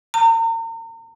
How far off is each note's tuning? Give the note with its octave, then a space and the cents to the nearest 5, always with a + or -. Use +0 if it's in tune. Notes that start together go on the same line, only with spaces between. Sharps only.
A#5 -40